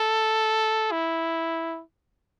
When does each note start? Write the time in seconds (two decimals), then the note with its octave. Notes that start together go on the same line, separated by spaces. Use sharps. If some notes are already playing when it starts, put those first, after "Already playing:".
Already playing: A4
0.92 E4